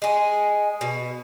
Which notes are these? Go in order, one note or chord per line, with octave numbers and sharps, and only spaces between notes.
G#3 G#4
B2